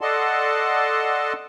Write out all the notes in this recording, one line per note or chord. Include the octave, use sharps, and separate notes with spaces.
A4 D5 D#5 F#5 A5 C6